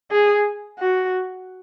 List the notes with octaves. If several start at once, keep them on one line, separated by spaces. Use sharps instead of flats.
G#4
F#4